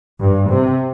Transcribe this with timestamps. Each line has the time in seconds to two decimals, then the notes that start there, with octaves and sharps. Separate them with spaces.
0.20 G2
0.49 C3